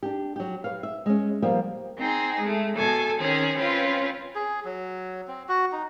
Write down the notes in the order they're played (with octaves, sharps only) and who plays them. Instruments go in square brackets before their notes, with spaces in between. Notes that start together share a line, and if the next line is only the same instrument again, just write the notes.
[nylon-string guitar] D4 G4
F#3 G4
B4 C#5 F5
E5
G#3 C#4
F3 G3 A#3 B3
[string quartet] C4 D#4 G#4
G#3 A3
B2 A4 G#5
D#3 C4 C#4 G#4
C4 C#4 F4 B4
[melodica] G#4
F#3
C4
F#4
D#4